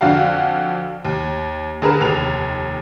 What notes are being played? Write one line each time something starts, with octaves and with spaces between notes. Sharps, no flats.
F2 D3 D4 F#4 F5
D#2
D3 G#4 A#4 B4 E7
F1 D#2 F7